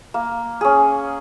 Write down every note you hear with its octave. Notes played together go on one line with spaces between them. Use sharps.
A#3
C#4 G#4